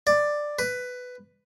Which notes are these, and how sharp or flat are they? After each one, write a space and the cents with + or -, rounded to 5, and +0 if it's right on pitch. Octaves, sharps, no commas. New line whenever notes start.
D5 +10
B4 +10